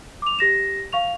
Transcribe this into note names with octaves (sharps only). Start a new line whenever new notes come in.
D6 F7
G4 A#6 E7
F5 C#6 F7